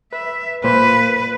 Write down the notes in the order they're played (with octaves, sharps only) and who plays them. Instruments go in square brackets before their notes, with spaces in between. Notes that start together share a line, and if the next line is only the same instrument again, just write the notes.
[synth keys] B4 [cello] E5
[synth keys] A#2 A#3 C5 [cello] B4